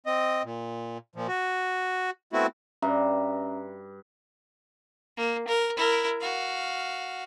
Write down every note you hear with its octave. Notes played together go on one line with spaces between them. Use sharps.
C4 D#5
A#2
A#2 F3
F#4
A3 B3 C4 E4 F#4
G2 C#4 E5 A#5
A#3
A#4
E4 A#4
F#4 F5